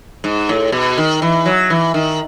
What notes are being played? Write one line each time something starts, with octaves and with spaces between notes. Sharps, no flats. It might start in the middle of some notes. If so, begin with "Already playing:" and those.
G#2
A2
B2
D#3
E3
F#3
E3
D#3